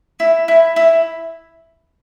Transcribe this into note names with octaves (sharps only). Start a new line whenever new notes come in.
E4
E4
E4